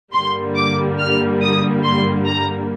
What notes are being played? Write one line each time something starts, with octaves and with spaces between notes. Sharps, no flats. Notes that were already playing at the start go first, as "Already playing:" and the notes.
G2 D3 G3 A#3 C6
D6
F6
D#6
C6
A#5